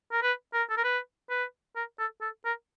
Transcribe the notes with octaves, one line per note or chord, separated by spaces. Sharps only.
A#4
B4
A#4
A4
A#4
B4
B4
A#4
A4
A4
A#4